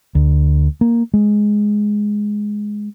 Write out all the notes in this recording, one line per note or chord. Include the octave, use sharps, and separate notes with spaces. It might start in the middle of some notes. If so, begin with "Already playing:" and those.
D2
A#3
G#3